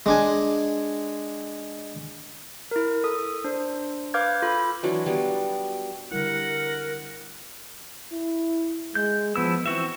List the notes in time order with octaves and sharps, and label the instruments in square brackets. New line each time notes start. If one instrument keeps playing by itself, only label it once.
[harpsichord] G#3 D4 G#5
[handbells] E4 A#4
A4 D#6
D4 C5
B4 F5 D6 F6 G6 G#6
F4 A4 B5
[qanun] E3 F#3 D4
F#3 G3 B3
[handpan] D3 G3 E4 [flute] A#4 [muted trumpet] F#5
[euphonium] E4
[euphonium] G#3 [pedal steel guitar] G6
[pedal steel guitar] F3 E4 E6 [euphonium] B3
[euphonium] E3 [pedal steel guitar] C4 F#4 E5